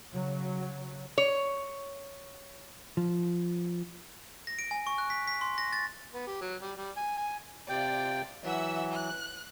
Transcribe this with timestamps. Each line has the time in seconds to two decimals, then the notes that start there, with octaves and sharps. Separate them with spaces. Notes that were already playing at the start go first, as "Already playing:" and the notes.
0.13 C#3 F#3
1.18 C#5
2.97 F3
4.47 A#6
4.59 D7
4.71 G#5
4.87 C#6
4.98 F#6
5.10 B6
5.28 B6
5.41 C6
5.58 A#6
5.73 A6
6.14 B3
6.27 G4
6.41 F#3
6.62 G3
6.77 G3
6.97 G#5
7.17 G#5
7.69 C3 F4 D5 G5
8.44 E3 F#3 E5 F#5 E6
8.92 F#6